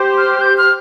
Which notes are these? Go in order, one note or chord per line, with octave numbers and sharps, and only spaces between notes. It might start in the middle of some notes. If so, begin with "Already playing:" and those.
Already playing: G4 C5
F6
G6
F6